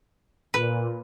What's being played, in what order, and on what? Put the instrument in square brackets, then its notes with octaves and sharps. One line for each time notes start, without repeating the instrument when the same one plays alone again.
[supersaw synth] A#2 [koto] B4